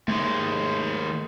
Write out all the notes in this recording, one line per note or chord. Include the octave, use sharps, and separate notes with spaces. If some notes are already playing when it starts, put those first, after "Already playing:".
D#2 G#3 A3